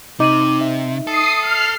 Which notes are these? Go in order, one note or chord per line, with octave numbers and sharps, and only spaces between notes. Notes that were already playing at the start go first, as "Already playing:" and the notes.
C3 D#4 D6 D#7 F#7
E5
A4 D#6 C7
F6 C7